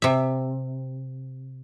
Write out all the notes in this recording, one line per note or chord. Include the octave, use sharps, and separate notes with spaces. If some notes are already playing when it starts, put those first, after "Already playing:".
C3 E5